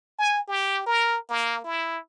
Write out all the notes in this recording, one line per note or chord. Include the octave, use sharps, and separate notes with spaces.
G#5
G4
A#4
A#3
E4